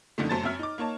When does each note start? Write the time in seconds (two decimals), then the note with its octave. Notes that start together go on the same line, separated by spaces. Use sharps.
0.18 F2 D3 D#3 A3
0.29 F#2 A3 C5 A5 A6
0.44 F#2 C4 E5 F6
0.59 D#4 D6
0.78 A#3 D#4 C#5 A5